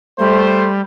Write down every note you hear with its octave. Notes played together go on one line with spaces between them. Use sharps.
G3 A3 C5